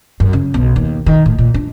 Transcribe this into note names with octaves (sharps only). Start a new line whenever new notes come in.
F#2
C#3
B1
D#2
D#3
A2
A#2
D4